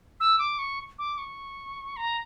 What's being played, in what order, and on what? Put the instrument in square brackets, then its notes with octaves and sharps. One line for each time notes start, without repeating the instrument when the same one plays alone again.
[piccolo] E6
D6
C#6
D6
C#6
A#5